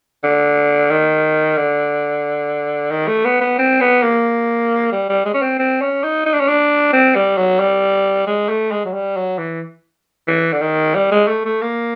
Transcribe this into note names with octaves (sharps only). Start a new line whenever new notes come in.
D3
D#3
D3
D#3
A3
B3
B3
C4
B3
A#3
G3
G3
G#3
C#4
C4
C4
C#4
D#4
D#4
D4
C#4
D4
C4
G3
F#3
G3
G#3
A3
G#3
F#3
G3
F#3
E3
E3
D3
D#3
G3
G#3
A3
A3
A#3